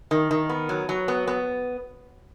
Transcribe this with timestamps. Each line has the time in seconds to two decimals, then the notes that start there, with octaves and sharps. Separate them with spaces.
0.11 D#3
0.31 D#3
0.49 B3
0.69 F#3
0.89 F#3
1.08 B3
1.27 B3